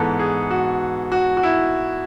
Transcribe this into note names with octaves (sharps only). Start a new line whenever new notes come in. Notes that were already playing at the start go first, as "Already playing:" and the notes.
Already playing: G#2 E3 B3 A4
G#4
F#4
F#4
F#4
E4